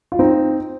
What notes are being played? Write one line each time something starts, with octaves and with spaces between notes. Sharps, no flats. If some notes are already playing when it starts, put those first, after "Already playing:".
F4
C4 D#4